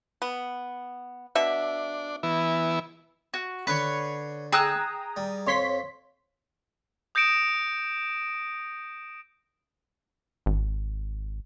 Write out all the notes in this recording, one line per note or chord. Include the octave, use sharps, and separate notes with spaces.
B3
B2 D4 E5
E3 B3 E4
F#4
D3 B4 C#5 C6 C#6
G#4 G5 A#5 D#6 E6 F#6
G3
F2 C#5 C6 B6
D#6 G6 A#6 C#7 D7 E7
G#1